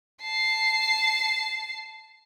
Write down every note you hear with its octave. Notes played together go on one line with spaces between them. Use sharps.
A5 C7